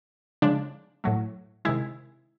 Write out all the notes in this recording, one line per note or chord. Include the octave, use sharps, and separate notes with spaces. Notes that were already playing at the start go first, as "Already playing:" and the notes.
C#3 F3 G#3 D4
A2 F#3 A3
C3 D#3 G#3 E4